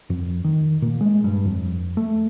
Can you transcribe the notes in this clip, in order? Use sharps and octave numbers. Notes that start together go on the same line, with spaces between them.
F2
D#3
A#2
G#3
G2
F2
A3